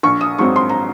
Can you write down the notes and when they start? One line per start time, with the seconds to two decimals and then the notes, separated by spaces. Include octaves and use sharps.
0.03 A#1 C#6
0.21 D#6
0.38 G#2 F#3 C4 C#6
0.56 C6
0.69 A#5